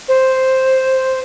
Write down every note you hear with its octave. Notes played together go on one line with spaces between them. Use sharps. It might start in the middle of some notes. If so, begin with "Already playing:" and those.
C5